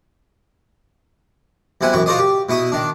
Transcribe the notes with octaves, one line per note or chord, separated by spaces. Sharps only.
B1 C3 E4 F#5 G#5
F#2 E3 C#6
F4 F#4 A#4 C5 D5 D#5
G4
B2 E4 C#6 D#6
D#3 D4